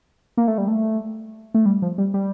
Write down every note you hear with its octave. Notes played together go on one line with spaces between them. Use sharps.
A#3
A3
G3
A3
A3
G3
F3
G3
G3